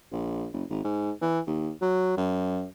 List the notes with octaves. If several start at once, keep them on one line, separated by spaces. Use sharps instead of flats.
A#1
F#1
G#1
G#2
E3
D#2
F#3
F#2